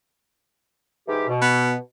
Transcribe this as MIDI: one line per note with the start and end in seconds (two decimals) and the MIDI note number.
1.08 1.27 44
1.08 1.27 52
1.08 1.27 67
1.28 1.76 47
1.42 1.74 59